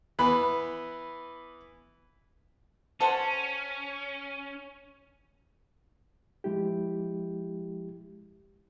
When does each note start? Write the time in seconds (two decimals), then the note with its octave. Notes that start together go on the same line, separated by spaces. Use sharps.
0.19 E3 B3 B5
3.00 C#4 A4 C5 F#5
6.44 F3 G#3 E4 G4